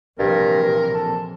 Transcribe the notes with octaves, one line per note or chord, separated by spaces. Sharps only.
A#1 G2 C3 E3 A#4
G2
A4